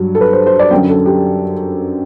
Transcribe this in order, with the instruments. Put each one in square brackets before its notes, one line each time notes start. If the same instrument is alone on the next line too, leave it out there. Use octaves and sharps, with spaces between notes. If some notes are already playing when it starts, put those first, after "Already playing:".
Already playing: [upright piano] G2 F#3
A4
B4
C5
C5
D5
F#2 D3 F#3 G5
A4
G4